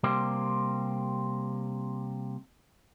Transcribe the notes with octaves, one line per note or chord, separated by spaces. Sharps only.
C3 G3 A#3 C4